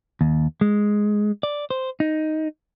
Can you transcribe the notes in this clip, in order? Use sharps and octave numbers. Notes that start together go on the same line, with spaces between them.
D#2
G#3
D5
C5
D#4